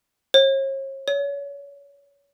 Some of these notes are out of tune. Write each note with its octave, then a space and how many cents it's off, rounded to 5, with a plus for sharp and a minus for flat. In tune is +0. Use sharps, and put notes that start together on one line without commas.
C#5 -40
C#5 +30